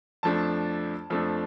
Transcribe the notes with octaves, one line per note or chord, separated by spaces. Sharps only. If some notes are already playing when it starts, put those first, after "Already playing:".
F2 F3 A3 D4 A5
F2 F3 A3 D4